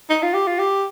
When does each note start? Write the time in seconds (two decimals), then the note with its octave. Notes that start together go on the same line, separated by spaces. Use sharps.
0.10 D#4
0.23 F4
0.34 G4
0.47 F4
0.59 G4